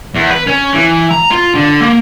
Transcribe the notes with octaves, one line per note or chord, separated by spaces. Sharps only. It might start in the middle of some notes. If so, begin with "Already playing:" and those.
E2
B4
C#4
E3
A#5
F4
D3
A#3